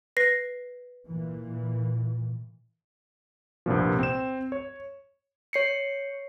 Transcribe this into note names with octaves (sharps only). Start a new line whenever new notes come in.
B4 A#6 C7
A#2 E3
C2 G2 A#2 F3
C4 E7
C#5
C#5 C7 C#7